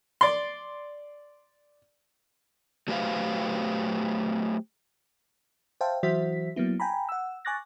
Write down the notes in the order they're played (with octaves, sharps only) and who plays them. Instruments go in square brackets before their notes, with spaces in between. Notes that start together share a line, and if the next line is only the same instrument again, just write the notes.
[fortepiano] D5 C6
[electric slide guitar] F#3 A3 G4 B4 C5 F5
[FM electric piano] C5 E5 F5 G5 A5
E3 F#3 F#4 C5 E5 B6
F#3 A#3 B3 E4
G5 G#5 A#5 B5
F#5 E6
G#5 C#6 D6 F#6 A6 A#6